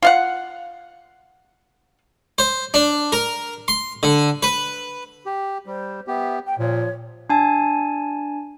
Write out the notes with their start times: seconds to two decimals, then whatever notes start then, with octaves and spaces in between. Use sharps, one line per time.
0.03 F4 F5 F#5
2.38 C5
2.74 D4
3.12 A#4
3.68 C6
4.03 D3
4.43 B4
5.26 G4
5.66 G3 C5
6.08 B3 G4 E5
6.46 G5
6.59 A#2 F3 C#5
7.30 D4 G#5 A5